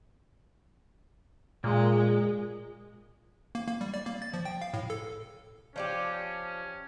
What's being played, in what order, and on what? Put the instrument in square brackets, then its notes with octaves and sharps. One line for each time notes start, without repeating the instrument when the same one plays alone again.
[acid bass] A#2 [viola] G#3
[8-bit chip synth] A#3
A#3
G3
D5
A#3
A6
F3
G5
F5
A2
A4
[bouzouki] F3 D4 G4 [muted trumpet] C#4